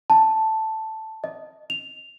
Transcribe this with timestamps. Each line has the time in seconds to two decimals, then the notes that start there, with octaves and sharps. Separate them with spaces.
0.10 A5
1.24 D#5
1.70 F7